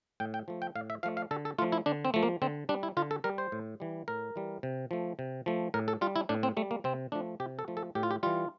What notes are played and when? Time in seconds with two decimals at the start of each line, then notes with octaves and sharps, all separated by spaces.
0.20 A2 G5
0.34 G5
0.48 F3 A3
0.62 G5
0.75 A2 F5
0.90 E5
1.03 F3 A3 F5
1.17 F5
1.31 D3 A4
1.45 A4
1.58 A3 F4
1.62 F3
1.72 E4
1.86 D3 D4
2.05 C4
2.14 F3 A3
2.23 A#3
2.42 D3 C4
2.69 G3 D4
2.83 E4
2.97 D3 F4
3.11 A4
3.24 G3 A#4
3.38 C5
3.52 A2
3.80 E3 G3
4.08 A2 A#4
4.36 E3 G3
4.63 C3
4.91 F3 A3
5.19 C3
5.46 F3 A3
5.74 A2 A#4
5.88 A4
6.01 G3 F4
6.16 E4
6.29 A2 D4
6.43 C4
6.57 G3 A3
6.71 A#3
6.84 C3 C4
7.12 F3 A3 D4
7.40 C3 G4
7.59 A4
7.68 F3 A3
7.77 A4
7.95 A2 G4
8.03 F4
8.11 G4
8.23 E3 G3 F4